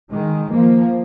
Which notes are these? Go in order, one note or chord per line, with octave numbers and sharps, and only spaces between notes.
D#3 G#3
F3 A#3